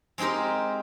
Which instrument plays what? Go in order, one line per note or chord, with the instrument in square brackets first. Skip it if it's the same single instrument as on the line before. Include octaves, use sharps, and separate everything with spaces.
[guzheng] G#3 C4 D#4 G4 A#4